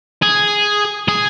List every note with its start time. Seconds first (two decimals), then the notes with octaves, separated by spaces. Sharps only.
0.22 G#4
1.09 G#4